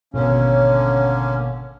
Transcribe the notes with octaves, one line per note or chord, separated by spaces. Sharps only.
G#1 B2 D3 A#3 C#4 C#5